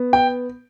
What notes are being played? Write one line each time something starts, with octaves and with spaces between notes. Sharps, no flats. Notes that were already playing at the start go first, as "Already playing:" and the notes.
Already playing: B3
G5